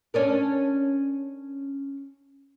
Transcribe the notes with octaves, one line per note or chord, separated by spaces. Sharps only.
C#4 D4 A#4